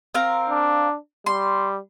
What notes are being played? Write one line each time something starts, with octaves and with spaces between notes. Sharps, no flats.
C4 A#4 F5
D4
G3 C6